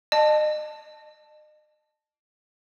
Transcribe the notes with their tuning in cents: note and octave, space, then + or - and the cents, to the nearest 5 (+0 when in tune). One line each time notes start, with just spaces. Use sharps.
D#5 -40 A5 +0